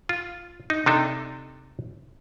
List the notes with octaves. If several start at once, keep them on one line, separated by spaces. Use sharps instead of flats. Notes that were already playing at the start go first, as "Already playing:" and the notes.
F4
D#4
C3 D4 D#4 A4